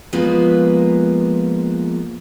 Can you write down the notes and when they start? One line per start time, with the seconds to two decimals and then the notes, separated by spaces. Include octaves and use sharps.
0.13 F3 G#3 A#3 B3 F4 B4